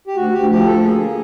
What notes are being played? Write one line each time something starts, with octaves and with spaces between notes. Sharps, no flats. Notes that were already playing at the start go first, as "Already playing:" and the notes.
G4
D2 F#4
D2 G4
F3 G4
D2 A4
A#3 G#4
A#3